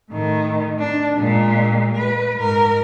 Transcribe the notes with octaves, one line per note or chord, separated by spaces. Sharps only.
A2 D#3
D4
A#2 G#3
B4
G#2 A#4